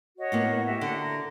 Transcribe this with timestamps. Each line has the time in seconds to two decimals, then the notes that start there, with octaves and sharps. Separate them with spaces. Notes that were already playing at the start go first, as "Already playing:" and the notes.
0.18 F#4 C#5 D#5
0.32 A2 A#3 B3
0.66 F#4 G4 E5
0.81 D3
1.00 A#5